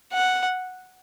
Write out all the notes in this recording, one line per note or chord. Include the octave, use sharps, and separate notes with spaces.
F#5